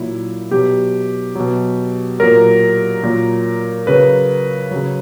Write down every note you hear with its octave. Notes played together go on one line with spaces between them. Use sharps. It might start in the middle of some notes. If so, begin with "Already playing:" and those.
Already playing: A#2 F#3 E4
B2 F#3 G4
B2 F#3
A#2 F#3 A#4
A#2 F#3
C#3 F#3 B4
C#3 F#3